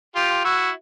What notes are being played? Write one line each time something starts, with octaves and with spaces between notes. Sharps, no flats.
F4 G4
E4 F#4